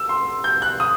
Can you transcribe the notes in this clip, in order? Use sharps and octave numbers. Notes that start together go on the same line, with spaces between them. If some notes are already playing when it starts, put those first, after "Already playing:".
Already playing: E6
C6
G6
F#6
D#6